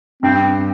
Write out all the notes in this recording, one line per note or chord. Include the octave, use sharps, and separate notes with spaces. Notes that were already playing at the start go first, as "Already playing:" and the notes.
G2 C4